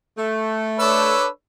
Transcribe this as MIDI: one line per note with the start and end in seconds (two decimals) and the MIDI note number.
0.18 1.12 57
0.80 1.28 62
0.80 1.25 69
0.80 1.28 71
0.80 1.28 73
0.80 1.25 74
0.80 1.25 88